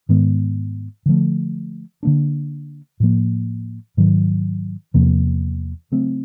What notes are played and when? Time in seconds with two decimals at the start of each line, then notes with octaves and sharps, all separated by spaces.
0.09 G#2 D#3 G#3 B3
1.06 D3 F3 A3
2.03 D3 F#3 A#3 D4
3.00 A2 F3 A#3
3.97 G#2 D#3 F#3
4.94 E2 C3 F3 A#3
5.92 C#3 F#3 A3 C4